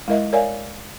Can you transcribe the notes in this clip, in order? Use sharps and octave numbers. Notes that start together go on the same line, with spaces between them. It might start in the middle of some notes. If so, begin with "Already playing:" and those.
G#3 E4 A#4 D#5 E5
A#4 C#5 D5 E5 F5 G#5